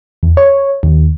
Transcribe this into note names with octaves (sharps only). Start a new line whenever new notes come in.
E2
C#5
D#2